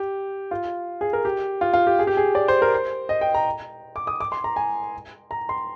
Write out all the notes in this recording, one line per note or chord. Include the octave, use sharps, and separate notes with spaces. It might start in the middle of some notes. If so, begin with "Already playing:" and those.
Already playing: G4
F4
G#4
A#4
G4
F4
F4
G4
G#4
G4
G#4
D5
C5
A#4
C5
D#5
G5
A#5
D6
D#6
D6
C6
A#5
G#5
A#5
C6